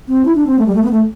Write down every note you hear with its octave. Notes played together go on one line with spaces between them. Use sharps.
C4
E4
D4
C4
A3
G3
A3
B3
A3